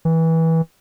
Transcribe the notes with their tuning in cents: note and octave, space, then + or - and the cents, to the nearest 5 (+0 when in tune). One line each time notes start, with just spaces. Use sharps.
E3 -20